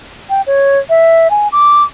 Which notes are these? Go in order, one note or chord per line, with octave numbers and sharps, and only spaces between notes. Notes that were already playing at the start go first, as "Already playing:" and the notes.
G5
C#5
E5
G#5
D6